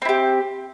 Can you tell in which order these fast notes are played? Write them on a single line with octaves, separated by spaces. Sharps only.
C4 E4 G4